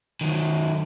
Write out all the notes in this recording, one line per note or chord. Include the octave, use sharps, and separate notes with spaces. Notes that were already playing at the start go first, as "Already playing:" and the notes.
D#3 F#3